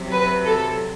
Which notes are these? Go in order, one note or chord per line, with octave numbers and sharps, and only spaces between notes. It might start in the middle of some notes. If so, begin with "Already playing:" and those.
Already playing: C3 F#3
B4
A4